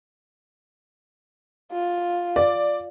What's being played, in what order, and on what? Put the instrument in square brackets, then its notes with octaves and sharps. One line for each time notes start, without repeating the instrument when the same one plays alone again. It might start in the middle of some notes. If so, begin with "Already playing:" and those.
[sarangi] F4
[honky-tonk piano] D5